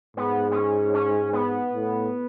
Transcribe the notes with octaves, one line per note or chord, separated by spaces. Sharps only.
G#2 B3
B3
C#4
C#4
B3
A2